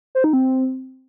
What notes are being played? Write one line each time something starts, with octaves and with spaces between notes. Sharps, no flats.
C5
D#4
C4